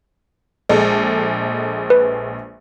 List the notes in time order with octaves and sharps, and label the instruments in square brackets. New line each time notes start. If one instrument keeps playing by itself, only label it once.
[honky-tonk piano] A#1 G#3 A4
[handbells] B4